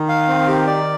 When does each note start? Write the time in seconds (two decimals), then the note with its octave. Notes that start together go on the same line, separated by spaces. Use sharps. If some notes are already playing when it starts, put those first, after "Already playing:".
Already playing: D#3
0.09 F5
0.28 C4
0.47 G4
0.67 D5